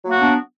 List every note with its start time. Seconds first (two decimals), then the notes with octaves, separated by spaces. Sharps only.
0.03 F#3
0.07 A#3
0.12 F#4
0.16 B3
0.20 D4